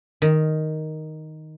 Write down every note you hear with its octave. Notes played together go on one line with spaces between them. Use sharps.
D#3